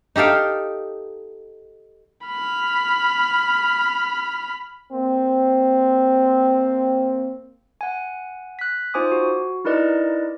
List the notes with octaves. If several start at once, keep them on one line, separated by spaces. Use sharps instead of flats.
D#4 G4 A4 F5 G5
B5 F6
A#3 C4
F#5 G#5
F#6 B6
D#4 F4 C5 G#5 D6 D#6
F#4
D#4 E4 A#4 B4 D5 D#5